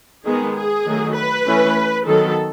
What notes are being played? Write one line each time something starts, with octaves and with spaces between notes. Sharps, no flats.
D#3 G#3 B3 G#4
G#4
D#3 F#3 A3
B4
E3 A3 C#4
D#3 F#3 B3 A4